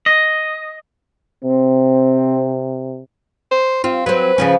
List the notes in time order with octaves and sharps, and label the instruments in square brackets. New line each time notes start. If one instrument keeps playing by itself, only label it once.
[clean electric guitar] D#5
[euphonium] C3 [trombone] C4
[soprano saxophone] C5
[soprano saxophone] C4 [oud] F4
[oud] F#3 C4 [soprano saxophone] B4
[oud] C#3 F3 C#4